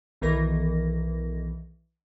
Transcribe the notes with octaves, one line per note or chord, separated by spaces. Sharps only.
B1 D#3 E3 A#4 A#6